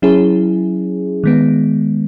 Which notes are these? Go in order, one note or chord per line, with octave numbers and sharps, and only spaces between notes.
F#3 C#4 E4 G#4
D#3 G#3 B3